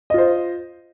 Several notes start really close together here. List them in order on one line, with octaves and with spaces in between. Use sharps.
D#5 F4 C5